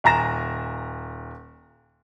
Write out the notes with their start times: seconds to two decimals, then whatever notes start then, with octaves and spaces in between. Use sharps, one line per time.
0.04 D#1 G#5 A#5 A#6 E7